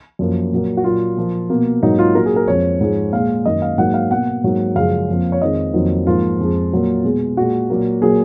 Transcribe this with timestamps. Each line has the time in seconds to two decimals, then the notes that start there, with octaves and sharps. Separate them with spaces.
0.19 F#2 F3 A#3
0.52 A#2 F#3 A#3
0.77 F#4
0.84 A#2 F#3 A#3 F4
1.17 A#2 F3 A#3
1.50 B2 A#3
1.83 G#2 F#3 A#3 D#4
1.99 F4
2.15 A#2 F#3 A#3 A#4
2.26 G#4
2.36 A#4
2.47 F2 F3 G#3 C#5
2.81 G#2 F3 G#3
3.12 A#2 G#3 F5
3.46 F#2 D#3 A#3 D#5
3.62 F5
3.78 G#2 F#3 A#3 F#5
3.94 F5
4.11 B2 A#3 F#5
4.44 G#2 F#3 A#3
4.75 F#2 C#3 F3 G#3 F5
5.09 F2 F3 A#3
5.32 C#5
5.41 F2 D#3 G#3 D#5
5.74 F2 D#3 F#3 A#3
6.07 G#2 F3 A#3 F4
6.39 F2 F3 G#3
6.72 A#2 F#3 A#3
7.04 B2 G#3
7.37 A#2 G#3 F#4
7.70 A#2 F#3 A#3
8.02 A#2 F#3 A#3 G#4